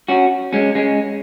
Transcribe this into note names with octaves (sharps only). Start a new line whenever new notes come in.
C#4 F#4
G#3 C#4
G#3 C#4